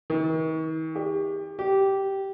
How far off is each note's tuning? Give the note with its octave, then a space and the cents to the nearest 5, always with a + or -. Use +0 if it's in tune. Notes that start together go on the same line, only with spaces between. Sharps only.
D#3 +45
G4 +30
G4 -10